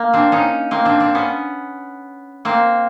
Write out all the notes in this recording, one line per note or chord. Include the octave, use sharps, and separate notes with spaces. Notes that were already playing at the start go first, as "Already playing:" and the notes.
Already playing: A#3
C4 D4
C#4 D#4
A#3 C4
C4 D4
C4 D4
B3 C#4
A#3 C4